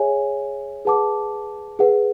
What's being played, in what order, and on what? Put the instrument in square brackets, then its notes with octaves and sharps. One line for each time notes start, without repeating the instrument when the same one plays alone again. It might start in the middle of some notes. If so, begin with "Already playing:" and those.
Already playing: [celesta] G#4 C#5 E5 G#5
G#4 B4 F#5 A5 D6
G#4 B4 F#5